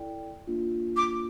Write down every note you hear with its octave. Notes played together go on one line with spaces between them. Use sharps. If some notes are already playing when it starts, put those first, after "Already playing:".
Already playing: E4 A4 D5 G5
A#3 D4 F4
D6